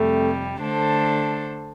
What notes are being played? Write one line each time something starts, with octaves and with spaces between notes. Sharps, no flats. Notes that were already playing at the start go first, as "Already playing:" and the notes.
Already playing: F2 C3 G3 A3
D3 A3 D4 A4 C5